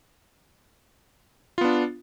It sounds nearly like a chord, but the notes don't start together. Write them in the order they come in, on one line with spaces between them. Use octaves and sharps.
F4 B3 D4